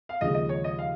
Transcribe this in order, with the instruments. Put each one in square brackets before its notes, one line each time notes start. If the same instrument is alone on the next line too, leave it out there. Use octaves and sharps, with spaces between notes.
[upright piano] F5
[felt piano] D#2 C#3 F3 G#3 [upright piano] D#5
[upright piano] D#5
C#5
D#5
F5